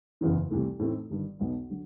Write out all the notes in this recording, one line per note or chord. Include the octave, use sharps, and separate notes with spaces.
F#1 E2 C#3 E3
C2 C3 E3 A3
A2 E3 A3 C4 D#4
G1 G2 D#3
B1 B2 F#3 B3
D3 F#3